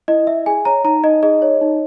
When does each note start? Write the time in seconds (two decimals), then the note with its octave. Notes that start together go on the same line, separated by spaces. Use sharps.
0.08 E4 D#5
0.27 E4 E5
0.46 G#4 G#5
0.65 C#5 A#5
0.84 D#4 A#5
1.03 D#4 D#5
1.23 G#4 D#5
1.42 C#5
1.61 D#4